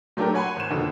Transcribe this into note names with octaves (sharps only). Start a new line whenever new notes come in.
F#3 A3 D4 G4 A#4
C#5 F#5 G#5 B5 C6
G#1 E7
F2 B2 D3 D#3 A#3